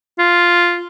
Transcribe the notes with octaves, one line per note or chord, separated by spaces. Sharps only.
F4